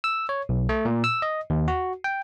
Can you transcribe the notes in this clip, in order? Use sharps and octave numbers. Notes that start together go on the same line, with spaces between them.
E6
C#5
B1
A3
A#2
E6
D#5
D#2
F#4
G5